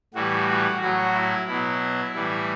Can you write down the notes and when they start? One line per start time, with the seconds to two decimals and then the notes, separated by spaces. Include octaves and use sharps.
0.14 A2 E3 G3 F#4
0.48 F#4
0.81 A2 F#3 F#4
1.14 E4
1.47 B2 F#3 E4
2.14 A2 E3 G3